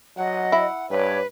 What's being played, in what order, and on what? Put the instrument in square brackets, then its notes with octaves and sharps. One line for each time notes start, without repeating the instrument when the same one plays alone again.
[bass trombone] F#3 [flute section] D#5 [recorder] F#5
[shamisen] E4
[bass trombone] G2 [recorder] B4 [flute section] C#5 D6